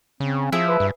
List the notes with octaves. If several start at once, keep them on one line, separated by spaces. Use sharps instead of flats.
C#3 C4
F3 E4 G#4 E5
B4
G2